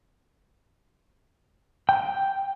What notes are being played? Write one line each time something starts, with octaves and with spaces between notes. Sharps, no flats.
G5